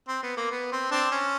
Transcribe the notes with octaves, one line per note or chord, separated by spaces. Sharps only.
C4
B3
A#3
B3
C4
C4 D4
C#4